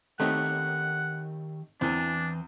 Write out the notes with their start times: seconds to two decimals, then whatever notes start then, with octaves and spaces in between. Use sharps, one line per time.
0.20 D#3 A3 C4 D#4 G4 C#5 F#5
1.81 E2 E3 C4 D4 B4